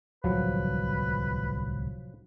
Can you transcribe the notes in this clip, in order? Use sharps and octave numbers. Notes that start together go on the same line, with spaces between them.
D1 C2 F3 F#3 B4